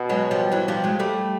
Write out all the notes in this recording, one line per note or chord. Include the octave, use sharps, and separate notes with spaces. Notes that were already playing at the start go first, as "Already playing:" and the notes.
Already playing: B2
F#3 G#3
F3 G3
E3 F#3
F3 G3
F#3 G#3
G3 A3